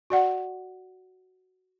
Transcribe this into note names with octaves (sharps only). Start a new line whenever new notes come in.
F#4 D5 F#5